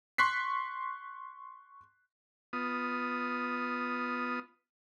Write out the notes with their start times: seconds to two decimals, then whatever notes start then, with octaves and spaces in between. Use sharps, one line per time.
0.18 C6 C#6 F#6 B6 C7
2.53 B3 F4 D#6